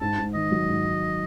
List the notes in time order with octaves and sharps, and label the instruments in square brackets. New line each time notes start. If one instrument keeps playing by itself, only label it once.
[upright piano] G#2 [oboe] A5
[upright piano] G#2
[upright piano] D#3 [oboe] D#5
[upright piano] F#3
G#2
G#2